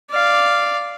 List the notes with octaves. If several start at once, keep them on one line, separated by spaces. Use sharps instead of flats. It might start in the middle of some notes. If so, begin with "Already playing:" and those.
D5 F5